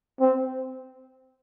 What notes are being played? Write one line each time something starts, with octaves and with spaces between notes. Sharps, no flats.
C4